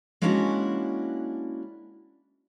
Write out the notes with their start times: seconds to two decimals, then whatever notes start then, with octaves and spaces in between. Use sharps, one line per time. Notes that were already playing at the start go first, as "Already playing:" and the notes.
0.22 G#3 A#3 C#4 D4 E4 F#4